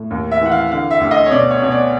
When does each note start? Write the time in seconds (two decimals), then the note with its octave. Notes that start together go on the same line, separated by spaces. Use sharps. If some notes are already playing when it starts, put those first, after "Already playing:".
Already playing: A2
0.11 D#2
0.31 E5
0.41 E3 F#5
0.52 F5
0.71 D3 F5
0.91 E5
1.00 D2
1.11 D#5
1.26 C#5
1.31 B2 D5
1.51 C#5
1.62 B2 C#5
1.71 D5